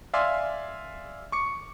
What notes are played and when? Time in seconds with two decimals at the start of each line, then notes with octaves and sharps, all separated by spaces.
0.13 D5 E5 F5 G#5 C6
1.32 C#6 D6 C#7